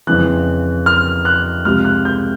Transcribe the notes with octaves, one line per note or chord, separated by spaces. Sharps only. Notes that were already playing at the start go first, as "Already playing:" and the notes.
F2 C#3 E3 F#6
F6
F#6
C#2 C3 F3 G#3 F6
F#6
G6